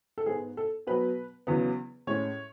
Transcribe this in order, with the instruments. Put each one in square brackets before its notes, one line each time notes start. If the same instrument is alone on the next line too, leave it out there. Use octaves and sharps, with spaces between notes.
[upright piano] A4
G#2 G#3 B3 G#4
A4
B2 F#3 B3 B4
E2 C#3 F#3 B3
A2 G#3 C#4 C#5